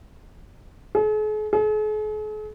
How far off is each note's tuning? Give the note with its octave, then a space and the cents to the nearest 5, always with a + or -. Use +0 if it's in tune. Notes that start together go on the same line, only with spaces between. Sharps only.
G#4 +45
G#4 +45